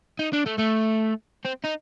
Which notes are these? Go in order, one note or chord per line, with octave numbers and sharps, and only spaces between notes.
D#4
D4
A3
A3
C4
D#4